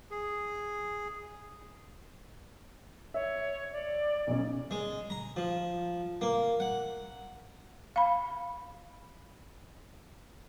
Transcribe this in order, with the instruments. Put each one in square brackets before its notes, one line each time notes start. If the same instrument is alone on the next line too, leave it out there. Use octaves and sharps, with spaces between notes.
[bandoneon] G#4
[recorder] C#5 [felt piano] E5
[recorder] D5
[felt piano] B1 C#4
[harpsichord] G#3
A#5
F3
A#3
F#5
[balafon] F5 B5